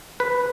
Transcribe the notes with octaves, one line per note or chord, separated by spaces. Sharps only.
B4